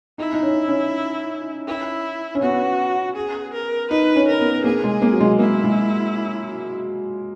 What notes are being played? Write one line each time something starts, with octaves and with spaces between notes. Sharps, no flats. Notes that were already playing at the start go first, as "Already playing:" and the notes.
D#4 E4
D#4
C#4
C#4
E4
C#4
B3 F#4
G#4
A#4
D#4 B4
C#4
A#4
B3
A#3 G#4
G#3
A#3
F#3
G#3
A#3 E4
G#3